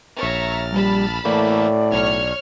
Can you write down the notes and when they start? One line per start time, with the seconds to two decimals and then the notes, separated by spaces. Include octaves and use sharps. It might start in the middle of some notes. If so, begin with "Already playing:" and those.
0.19 A#1 C#5 E5 A#5 F6 A6
0.72 G3 A5 B5
1.25 A2 E3 A3 A#3 D5
1.92 B1 C#5 F6 G#6